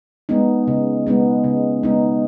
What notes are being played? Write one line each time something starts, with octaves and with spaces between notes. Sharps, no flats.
G#3 B3 D#4
C#3
G#3 B3 D#4
C#3
G#3 B3 D#4